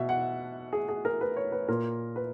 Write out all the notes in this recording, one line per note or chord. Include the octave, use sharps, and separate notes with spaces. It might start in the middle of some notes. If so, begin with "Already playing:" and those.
Already playing: B2 E5
F#5
G#4
G#4
A#4
B4
C#5
B4
A#2 A#4
B4